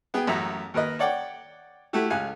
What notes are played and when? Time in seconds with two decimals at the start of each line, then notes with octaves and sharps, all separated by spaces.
0.14 B3 G#4 G5
0.27 A1 F#2 E5 A#5
0.74 D#2 A#4 B4 D#5
0.99 C#5 D5 F#5 G5 D6
1.93 A3 E4 F#4 G4
2.10 C#2 F5 G#5 F#6